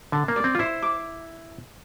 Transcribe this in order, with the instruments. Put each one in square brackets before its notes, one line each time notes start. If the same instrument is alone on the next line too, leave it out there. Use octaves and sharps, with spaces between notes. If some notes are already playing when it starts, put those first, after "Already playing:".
[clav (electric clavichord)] D3 [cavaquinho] A5
[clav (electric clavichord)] A#3
[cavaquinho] D5
[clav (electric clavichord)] C4
F4
[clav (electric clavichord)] E4 [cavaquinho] C5
[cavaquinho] D6